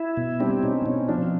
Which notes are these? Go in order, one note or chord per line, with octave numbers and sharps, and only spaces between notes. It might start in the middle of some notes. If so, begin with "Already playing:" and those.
Already playing: E4
B2
G3 C4 D4
B2 C#4 D#4
B2 C#4 D#4
F3 C4 D4